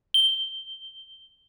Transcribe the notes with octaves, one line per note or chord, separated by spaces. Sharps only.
G7